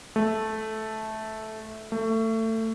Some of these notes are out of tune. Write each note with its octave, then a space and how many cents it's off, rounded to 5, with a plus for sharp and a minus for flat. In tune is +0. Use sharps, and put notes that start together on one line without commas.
A3 -10
A3 +25